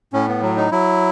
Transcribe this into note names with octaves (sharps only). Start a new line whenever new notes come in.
A2 C#4
B3
F#3
D#4
F#3 E4